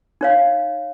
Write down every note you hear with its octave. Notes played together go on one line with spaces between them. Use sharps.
D#4 C#5 F5